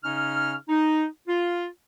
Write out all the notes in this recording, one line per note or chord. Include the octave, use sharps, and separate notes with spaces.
C#3 C#4 D#4 F6
D#4
F4